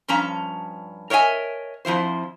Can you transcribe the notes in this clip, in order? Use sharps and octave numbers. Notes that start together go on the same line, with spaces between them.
G2 F3 C#4 A5 A#5
A#4 C#5 D#5 E5 G#5
F2 F3 E4 C5